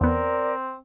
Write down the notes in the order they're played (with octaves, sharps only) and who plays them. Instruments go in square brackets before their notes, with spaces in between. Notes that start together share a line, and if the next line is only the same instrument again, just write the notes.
[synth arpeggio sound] E2 B3 [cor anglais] C4 [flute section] A#4 D5